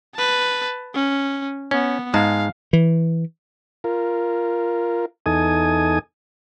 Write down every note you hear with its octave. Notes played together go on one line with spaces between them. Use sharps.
B4 A5
C#4
B3 C#4
G#2 G#3 F5 A5
E3
F4 A#4
E2 D#4 A4 G#5 D#6